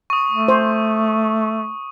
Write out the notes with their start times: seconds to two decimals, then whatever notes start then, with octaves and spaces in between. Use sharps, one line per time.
0.10 C#6 D#6
0.31 A3
0.48 C5